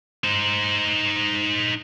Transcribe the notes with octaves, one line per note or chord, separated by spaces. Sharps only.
D#4 C5